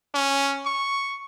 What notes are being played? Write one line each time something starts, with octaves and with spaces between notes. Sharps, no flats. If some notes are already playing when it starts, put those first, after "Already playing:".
C#4
C#6